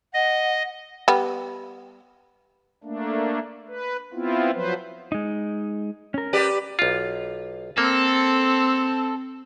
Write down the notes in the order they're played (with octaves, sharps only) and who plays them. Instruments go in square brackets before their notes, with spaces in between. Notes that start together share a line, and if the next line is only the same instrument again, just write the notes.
[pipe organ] D#5 [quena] F#5
[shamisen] G3 B3
[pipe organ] A3 A#3 D4
B4
B3 C4 E4 F4
F3 F#3 B4 C5
[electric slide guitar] G#3 D#4
C#4 A#4
[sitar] G4 B4 D5
[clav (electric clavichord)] B1 F4
[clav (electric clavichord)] A#3 [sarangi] C4 [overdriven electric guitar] A4